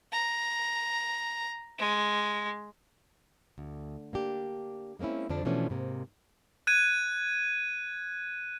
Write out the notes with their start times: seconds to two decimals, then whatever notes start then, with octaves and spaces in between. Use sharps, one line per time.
0.12 A#5
1.78 G#3
3.58 D2
4.13 A#3 D4 G4
4.99 G#3 A#3 C4 C#4 E4
5.29 F2 D3 F3 D4
5.45 B2 E3 F3 A3 C#4 D4
5.70 G#2 C3 A#3
6.67 F#6 G#6 D#7